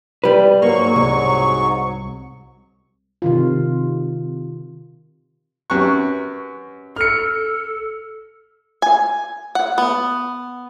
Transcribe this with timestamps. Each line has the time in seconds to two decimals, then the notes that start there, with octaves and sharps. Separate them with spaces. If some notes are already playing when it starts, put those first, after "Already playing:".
0.24 G3 B4
0.62 G#2 F#3 A#3 C#6
0.96 C2
3.22 C3 D#3 F4
5.70 F#2 G4 B4 C#6 F#6
6.96 A4 F6 C#7
8.82 G#5
9.55 F#5
9.78 B3